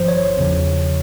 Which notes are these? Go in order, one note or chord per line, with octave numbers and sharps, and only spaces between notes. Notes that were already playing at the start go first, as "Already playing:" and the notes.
Already playing: G#1 G2 F3 C5
C#5
E2 C#3 F3